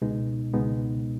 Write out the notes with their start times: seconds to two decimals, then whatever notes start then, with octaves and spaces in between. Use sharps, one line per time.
0.02 C#2 B2 G#3 B3 D#4
0.53 C#2 B2 G#3 B3 D#4